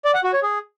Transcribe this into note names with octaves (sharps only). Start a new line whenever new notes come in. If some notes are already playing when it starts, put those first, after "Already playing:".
D5
F#5
F#4
C#5
G#4